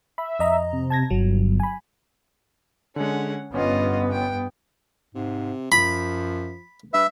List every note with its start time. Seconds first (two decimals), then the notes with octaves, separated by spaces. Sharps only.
0.18 E5 B5
0.39 F2 D#5 A#5
0.73 C3
0.90 A5 G#6 A#6
1.10 G1 F#3
1.60 G#5 B5
2.96 D3 G#3 C#4 F#5
3.54 G1 G2 B3 C#4 F4 D#5 F#5
4.12 G5
5.15 G#2 C3
5.72 F#2 F3 B5
6.94 G2 B4 E5